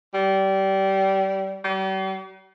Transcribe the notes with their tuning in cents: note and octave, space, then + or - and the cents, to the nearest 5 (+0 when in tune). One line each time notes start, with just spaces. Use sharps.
G3 -25
G3 -40